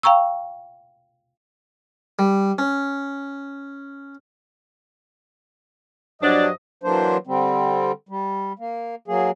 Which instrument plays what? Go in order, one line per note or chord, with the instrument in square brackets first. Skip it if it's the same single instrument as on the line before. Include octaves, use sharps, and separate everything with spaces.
[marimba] F5 G5 A#5 C#6 E6
[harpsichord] G3
C#4
[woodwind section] G2 F3 D#5 [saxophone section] F#3 D4
[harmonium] E3 F#3 A#3 D4 C5
D3 G3 C4
G3
A#3
F#3 A#3 G#4